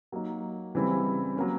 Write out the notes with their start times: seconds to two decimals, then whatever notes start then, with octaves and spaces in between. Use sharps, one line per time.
0.12 F#3 A#3 D#4
0.75 C#3 E3 G3 C4 E4
1.36 F#3 A#3 C#4